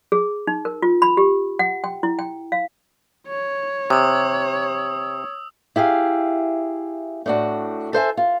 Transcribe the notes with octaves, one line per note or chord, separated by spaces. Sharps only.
G#4
D#4
A#4
F4
B5
G4
F#5
G5
E4
G5
F5
C#5
C3 D#6 E6
E4 G4 G#4 F5
A2 D4 F#4
A4 C5 E5 G#5
F4